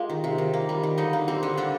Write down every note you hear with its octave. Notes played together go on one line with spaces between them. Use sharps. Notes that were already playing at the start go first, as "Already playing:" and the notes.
Already playing: G#3 A#3 F4 G4
D#3
C3
D#3
A#3
G3
D#3
D3 D#4
A#3
G3 C4
D3
D3 D4